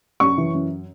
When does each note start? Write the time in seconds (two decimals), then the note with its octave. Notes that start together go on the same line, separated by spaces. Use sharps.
0.20 F#2 C#6
0.38 E3
0.54 F#2